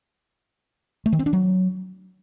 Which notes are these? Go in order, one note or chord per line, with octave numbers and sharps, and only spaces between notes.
A3
D#3
C4
D4
F#3